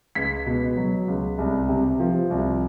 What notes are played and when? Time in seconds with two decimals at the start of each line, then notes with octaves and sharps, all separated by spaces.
0.15 C#2 B6
0.46 B2
0.77 F#3
1.08 C#2
1.38 C2
1.69 C3
2.00 F3
2.30 C2